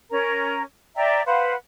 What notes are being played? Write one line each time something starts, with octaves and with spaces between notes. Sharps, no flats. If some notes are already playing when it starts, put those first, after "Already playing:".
C#4 A#4 A#5
D5 E5 G5 A#5
B4 C5 F5 F#5